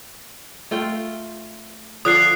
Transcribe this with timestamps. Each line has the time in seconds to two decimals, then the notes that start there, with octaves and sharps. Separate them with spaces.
0.71 A3 F4 G5
2.05 D3 F3 D4 D#6 F#6 C7